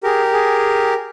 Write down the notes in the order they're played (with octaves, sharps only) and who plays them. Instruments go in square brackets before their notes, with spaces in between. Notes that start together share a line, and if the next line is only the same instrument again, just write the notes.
[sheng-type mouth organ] G4 A#4 [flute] G#4
[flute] G#4